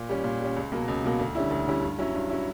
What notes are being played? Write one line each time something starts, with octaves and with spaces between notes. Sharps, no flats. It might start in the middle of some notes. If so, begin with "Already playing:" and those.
Already playing: A#2
G3 C#4
A#2
G3 C#4
C#2
B2 F#3 A#3
C#2
B2 F#3 A#3
D2
D3 G3 C#4 E4
D2
D3 G3 C#4 E4
G2
F#3 C#4 E4
G2
F#3 C#4 E4